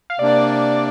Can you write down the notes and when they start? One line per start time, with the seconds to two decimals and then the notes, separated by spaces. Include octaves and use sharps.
0.10 F5
0.19 C3 A#3 D4 D5